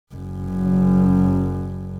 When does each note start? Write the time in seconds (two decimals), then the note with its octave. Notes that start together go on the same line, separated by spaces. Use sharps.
0.14 F#1 F#2